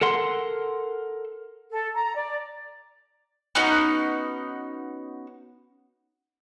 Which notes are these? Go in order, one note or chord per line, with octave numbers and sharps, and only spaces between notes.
A4 A#4 F#5 C6
A4
A#5
D5
B3 C#4 D#4 F#4